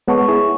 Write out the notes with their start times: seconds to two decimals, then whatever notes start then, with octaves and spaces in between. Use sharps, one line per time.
0.07 G#3 B3 C#5 F#5 A5 C#6
0.29 E4 G#4